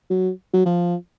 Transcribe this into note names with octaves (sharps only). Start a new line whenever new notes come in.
F#3
F#3
F3